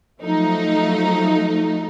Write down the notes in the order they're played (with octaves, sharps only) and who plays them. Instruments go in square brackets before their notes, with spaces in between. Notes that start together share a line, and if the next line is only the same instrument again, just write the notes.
[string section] F3 F#3 A3 D#4